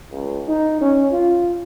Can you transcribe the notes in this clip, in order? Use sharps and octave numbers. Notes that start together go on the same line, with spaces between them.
C#2
D#4
C#4
F4